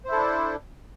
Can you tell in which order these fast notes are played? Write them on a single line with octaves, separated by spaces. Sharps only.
C5 E4 A4 D4